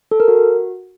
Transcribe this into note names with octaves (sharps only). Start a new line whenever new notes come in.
A4
A#4
F#4